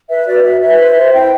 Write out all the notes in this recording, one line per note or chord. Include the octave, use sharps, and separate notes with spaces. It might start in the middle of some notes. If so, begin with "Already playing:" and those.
B4 E5
F#4 D5
F#4 E5
B4 E5
C5
C5
E4 G5